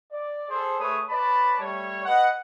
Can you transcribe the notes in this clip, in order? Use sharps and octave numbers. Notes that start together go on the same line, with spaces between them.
D5
G#4 A4 C5
A3 G#4 B4 C#5 D#6
B4 C#5 D5 A5 B5
G3 A3 C#5
B4 D#5 F#5